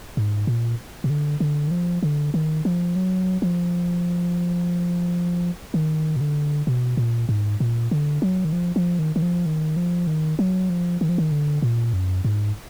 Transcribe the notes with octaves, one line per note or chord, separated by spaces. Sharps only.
G#2
A#2
B2
D3
D3
D#3
F3
D3
D#3
F3
F#3
F3
D#3
B2
D3
B2
A#2
G#2
A#2
D3
F#3
D#3
F3
F3
D#3
D#3
F3
D#3
F3
D#3
F#3
F3
D#3
F3
D#3
D3
A#2
F#2
G#2